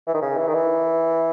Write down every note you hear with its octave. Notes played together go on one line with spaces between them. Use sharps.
E3
D#3
C#3
E3
D#3
E3